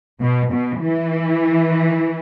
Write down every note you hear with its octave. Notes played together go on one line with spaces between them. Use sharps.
B2
B2
E3